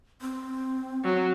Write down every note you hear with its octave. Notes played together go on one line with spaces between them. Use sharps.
C4
F#3